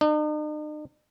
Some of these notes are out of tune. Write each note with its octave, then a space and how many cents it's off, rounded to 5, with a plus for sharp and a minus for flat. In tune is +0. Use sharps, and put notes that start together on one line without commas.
D#4 -45